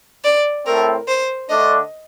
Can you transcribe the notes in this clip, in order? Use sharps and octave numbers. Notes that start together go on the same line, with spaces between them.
D5
A2 A3 C4 A#4
C5
D3 A3 D4 D#5